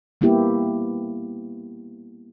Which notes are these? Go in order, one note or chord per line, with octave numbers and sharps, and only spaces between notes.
G3 A#3 B3 E4 G4